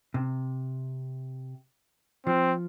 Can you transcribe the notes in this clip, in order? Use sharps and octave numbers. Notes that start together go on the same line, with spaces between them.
C3
F3 C4